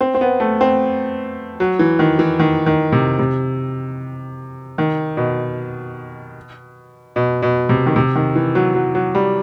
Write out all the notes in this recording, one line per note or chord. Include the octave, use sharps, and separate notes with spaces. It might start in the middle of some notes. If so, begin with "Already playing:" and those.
C4
C4
B3
A3
C4
F#3
E3
D#3
E3
D#3
D#3
C3
C3
D#3
B2
B2
B2
C3
D#3
C3
D#3
E3
F#3
F#3
F#3
G3